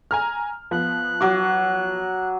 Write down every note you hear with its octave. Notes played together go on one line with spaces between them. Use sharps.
G#5 A#5 F6
F3 B3 F#6
F#3 D6